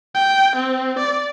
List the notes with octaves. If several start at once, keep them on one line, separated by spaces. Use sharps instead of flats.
G5
C4
D5